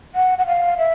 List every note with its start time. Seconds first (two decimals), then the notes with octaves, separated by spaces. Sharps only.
0.15 F#5
0.38 F#5
0.47 F5
0.78 E5